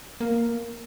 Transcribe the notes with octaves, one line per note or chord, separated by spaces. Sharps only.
A#3